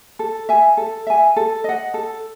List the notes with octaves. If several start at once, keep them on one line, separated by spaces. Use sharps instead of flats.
A4
E5 G#5
A4
E5 G#5
A4
D#5 F#5
A4